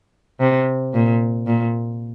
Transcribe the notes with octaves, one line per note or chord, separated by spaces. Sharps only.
C3
A#2
A#2